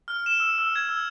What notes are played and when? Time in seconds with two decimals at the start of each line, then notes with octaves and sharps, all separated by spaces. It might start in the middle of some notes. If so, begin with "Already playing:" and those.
0.08 F6
0.26 E7
0.40 E6
0.58 E6
0.76 G#6
0.89 E6